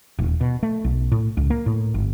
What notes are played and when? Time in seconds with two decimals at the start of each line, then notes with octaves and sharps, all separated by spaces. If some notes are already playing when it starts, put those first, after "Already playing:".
0.19 D#1
0.41 B2
0.63 A3
0.84 B1
1.12 A2
1.37 C#2
1.50 A#3
1.66 A2
1.94 G1